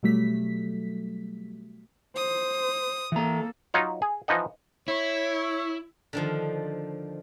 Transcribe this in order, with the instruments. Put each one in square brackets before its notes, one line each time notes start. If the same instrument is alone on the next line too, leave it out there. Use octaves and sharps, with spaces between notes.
[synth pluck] B2 F#3 G3 A3 B6
[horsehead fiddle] C5 [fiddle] D#6
[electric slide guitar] E3 A#5 [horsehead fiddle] A#3 A4
[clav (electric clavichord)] F#3 D#4 F4 C#5
G#4
E3 F3 D#4 D#5 F#5
[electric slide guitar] E4 [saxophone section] C#5
[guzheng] D3 D#3 F3